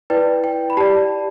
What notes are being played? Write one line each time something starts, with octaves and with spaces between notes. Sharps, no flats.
E4 B4 D5 G5
G5
B5
G4 D5 A5